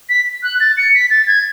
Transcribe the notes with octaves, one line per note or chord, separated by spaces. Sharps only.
B6
F#6
A6
C#7
B6
A6
G#6